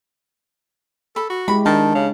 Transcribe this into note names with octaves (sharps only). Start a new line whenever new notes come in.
A4 B5
F#4
G#3 E4 G4 B5
D#3 D4 A5
C#3